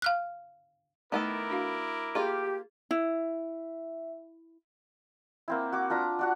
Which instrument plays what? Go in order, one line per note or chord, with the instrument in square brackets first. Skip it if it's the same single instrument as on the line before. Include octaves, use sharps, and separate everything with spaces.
[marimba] F5 F6 F#6
[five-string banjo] D#3 B3 A4 [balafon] A3 D#4 [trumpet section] E4 A#4 D6
[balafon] D4 F#4 F5
[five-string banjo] A#3 F4 [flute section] G4 [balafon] G#4
[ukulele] E4 [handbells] E5
[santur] A#3 C4 E4
F#4 D6
D4 F4 A#5 B5
D4 F#4 F#5